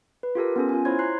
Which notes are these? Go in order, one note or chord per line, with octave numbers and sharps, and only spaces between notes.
B4
F4 G4 A4 A#4
B3 C#4 A4
F4 G#5
E4 C5 C#5 C6 G#6
A#5 C6 F#6 C7